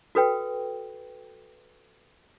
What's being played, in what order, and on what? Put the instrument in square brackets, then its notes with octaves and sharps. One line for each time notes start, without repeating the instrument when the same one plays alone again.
[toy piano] F#4 A4 B4 G5